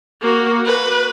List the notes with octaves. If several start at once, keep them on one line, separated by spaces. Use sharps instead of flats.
A#3 F#4
B4